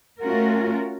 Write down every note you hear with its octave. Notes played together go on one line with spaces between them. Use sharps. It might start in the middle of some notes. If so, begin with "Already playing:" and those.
A3 C#4 F4 F#4 A#4